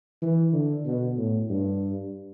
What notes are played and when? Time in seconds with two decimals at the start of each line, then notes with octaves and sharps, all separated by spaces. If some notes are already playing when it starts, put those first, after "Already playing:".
0.22 E3
0.53 D3
0.85 B2
1.17 A2
1.49 G2